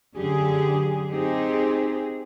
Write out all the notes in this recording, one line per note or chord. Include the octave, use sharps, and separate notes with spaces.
F#2 D3 G4 G#4
C4 D#4 G4 G#4